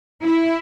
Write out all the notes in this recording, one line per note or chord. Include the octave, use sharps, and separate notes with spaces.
E4